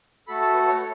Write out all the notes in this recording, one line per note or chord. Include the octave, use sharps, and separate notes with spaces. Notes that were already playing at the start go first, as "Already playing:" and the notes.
A3 F#4 A4 B5
A5
B4
C#5